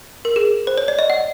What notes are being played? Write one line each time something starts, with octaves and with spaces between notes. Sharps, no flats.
A#4
G#4
C5
C#5
D5
D#5
F#5